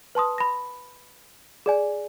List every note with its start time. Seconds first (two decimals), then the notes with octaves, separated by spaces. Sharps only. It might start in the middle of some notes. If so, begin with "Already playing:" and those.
0.15 B4 A5 C6 D#6
0.38 B5 A#6
1.66 G#4 D5 G#5